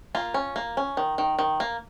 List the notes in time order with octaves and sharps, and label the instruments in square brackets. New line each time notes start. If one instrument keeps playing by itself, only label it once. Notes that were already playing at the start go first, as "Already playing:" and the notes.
[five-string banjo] A#3 F4
C#4
A#3
C#4
D#3
D#3
D#3
A#3